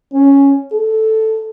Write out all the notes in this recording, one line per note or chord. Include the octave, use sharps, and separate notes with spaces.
C#4
A4